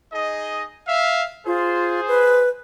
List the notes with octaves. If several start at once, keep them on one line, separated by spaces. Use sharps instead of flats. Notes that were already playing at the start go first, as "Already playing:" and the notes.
D#4 G#4 D#5
E5 F5
F4 G#4 C5
B4